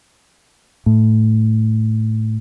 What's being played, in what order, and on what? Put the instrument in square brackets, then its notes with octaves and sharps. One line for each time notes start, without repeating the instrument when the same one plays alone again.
[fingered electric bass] A2